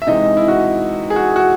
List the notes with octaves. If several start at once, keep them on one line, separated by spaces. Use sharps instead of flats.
E5
C3 E3 G#3 D#4 D#5
E4
F#4
G#4
F#4
F#4